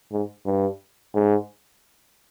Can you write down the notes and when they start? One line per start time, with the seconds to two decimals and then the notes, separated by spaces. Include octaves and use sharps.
0.12 G#2
0.46 G2
1.14 G#2